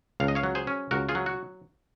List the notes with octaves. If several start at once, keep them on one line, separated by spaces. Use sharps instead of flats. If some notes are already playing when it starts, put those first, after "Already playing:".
C#2 F5
D#5
C#5 F5
F#3
G#4 C5
C#4
C#2 F#4 A#4
F4 G#4
F#3
F#4